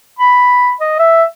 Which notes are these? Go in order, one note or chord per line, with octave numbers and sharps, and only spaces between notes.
B5
D#5
E5